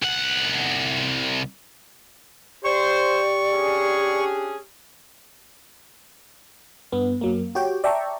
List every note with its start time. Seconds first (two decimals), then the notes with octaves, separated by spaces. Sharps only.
0.03 C2 F#5
2.64 G4 C5 D5 C#6
3.52 C#4 D4 G#4
6.92 G2 B3
7.21 F#2 F#3 A#3
7.55 F#4 G4 C#5 G5
7.84 D5 E5 G5 A5 A#5 C#6